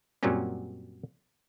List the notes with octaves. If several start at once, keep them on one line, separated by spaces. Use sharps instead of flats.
F#2 A#2 F#3 G3 C4 C#4